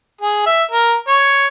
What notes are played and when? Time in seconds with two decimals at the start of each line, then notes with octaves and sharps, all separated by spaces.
0.21 G#4
0.46 E5
0.71 A#4
1.08 C#5